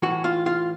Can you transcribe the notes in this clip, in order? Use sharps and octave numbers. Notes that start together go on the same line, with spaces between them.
A2 E3 F#4 F#5
F4 F5
F4 F5